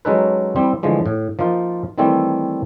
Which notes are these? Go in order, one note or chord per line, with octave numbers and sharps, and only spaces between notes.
F#3 G#3 C#4 D#4 A4 B4
G3 C4 E4
D3 E3 F3 G#3 A3
A2
F3 A#3 D#4 F4
D#3 E3 G3 A3 C4 E4